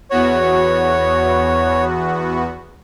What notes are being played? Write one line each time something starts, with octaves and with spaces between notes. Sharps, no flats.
E2 B3 F#4 C#5